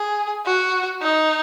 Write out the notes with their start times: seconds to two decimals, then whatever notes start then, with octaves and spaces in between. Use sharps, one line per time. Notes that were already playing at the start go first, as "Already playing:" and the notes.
Already playing: G#4
0.46 F#4
1.02 D#4